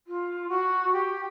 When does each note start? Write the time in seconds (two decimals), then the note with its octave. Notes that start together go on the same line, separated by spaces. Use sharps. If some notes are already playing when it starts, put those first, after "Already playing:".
0.07 F4
0.49 F#4
0.92 G4